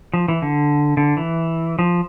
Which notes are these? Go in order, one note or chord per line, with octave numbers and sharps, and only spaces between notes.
F3
E3
D3
D3
E3
F3